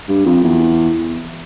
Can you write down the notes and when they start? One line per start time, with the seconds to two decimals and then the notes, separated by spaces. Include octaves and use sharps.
0.09 G2
0.26 F2
0.44 E2